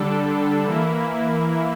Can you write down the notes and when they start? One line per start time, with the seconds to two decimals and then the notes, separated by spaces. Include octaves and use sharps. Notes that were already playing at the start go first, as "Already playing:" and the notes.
Already playing: D3 G3 D4 A4
0.66 E3 A#3 E4